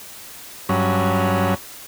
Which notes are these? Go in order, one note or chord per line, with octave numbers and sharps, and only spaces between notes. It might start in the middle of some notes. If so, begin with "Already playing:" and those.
G2 F#3 C#4